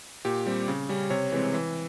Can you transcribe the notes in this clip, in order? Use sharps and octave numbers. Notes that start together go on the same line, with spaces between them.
A#2 G4
G3 C4
C#3
G3 C#4
C3 C#5
E3 G#3 C4
E3